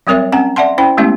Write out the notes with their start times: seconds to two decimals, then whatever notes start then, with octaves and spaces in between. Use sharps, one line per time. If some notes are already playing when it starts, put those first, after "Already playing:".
0.07 F#3 G3 C4 A#4 C#5 E5
0.32 C4 C#4 F#5 G#5 A#5
0.56 D5 E5 F#5 A5 C6
0.78 C#4 E4 C5 G5 B5
0.97 G#3 A3 B3 C#4 E4 G4